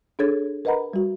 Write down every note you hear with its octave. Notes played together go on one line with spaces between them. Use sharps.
D4 G#4 A4 C#5 G#6 A6
A#4 B4 D#5 F#5 A#5 B5
G3 F#4